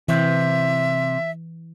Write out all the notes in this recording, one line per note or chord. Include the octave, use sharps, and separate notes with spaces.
C3 E3 E5